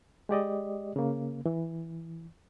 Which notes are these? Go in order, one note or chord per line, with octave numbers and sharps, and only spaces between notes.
G#3 G4 D5 D#5
C#3 A#3
E3